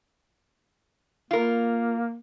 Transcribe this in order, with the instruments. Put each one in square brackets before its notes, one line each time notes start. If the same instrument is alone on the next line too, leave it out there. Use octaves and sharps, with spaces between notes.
[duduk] A#3 [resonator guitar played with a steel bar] F4 A#4